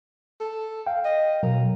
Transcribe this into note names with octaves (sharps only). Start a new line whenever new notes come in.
A4
F5 G5
D#5
B2 F#3 A#4